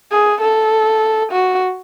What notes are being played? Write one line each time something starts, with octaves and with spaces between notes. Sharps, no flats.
G#4
A4
F#4